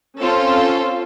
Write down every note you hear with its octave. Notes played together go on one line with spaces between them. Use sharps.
C4 C#4 F4 A4